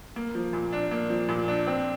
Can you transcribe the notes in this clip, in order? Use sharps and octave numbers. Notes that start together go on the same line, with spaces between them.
A#3
F3
A#2
D4
A#3
F3
A#2
D4
C4